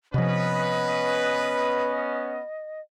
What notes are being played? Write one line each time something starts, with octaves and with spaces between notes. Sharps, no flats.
C3 F3 B3 C#4 B4 D#5